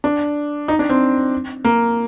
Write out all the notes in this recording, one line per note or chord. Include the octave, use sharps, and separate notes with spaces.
D4
D#4
D4
C4
A#3